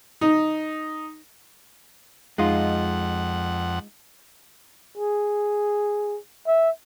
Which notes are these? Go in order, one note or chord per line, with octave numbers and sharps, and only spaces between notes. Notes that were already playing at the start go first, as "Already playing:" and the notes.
D#4
F2 G#3 D#4 F4 F#5
G#4
E5